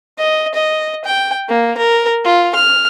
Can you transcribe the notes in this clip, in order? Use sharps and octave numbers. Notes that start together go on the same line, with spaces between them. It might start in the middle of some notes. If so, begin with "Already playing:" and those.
D#5
D#5
G5
A#3
A#4
F4
F6